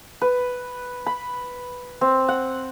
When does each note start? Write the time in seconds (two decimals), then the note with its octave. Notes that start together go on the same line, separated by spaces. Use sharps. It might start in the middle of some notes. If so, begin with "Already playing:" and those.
0.22 B4
1.06 B5
2.01 C4
2.28 F#5